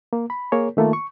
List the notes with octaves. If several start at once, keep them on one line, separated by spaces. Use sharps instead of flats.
A#3
B5
A#3 G#4 A#4 C#5
D#3 A3 A#3 F4
C#6